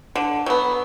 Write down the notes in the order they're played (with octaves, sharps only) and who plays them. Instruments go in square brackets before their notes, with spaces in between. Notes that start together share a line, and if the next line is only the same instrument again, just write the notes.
[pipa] D3
F#3 B3